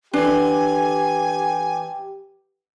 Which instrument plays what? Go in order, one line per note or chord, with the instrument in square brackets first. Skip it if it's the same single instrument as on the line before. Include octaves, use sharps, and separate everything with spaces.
[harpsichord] D3 E3 [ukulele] D4 [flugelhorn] G4 [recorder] G#5